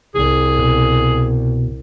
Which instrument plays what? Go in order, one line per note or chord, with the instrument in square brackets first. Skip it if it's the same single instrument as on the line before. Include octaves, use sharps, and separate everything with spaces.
[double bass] C2 [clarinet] G#4
[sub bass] B2